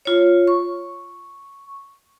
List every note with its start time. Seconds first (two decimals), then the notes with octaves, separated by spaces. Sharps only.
0.05 F4 C#5
0.47 C#6